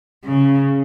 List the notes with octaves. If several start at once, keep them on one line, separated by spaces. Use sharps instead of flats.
C#3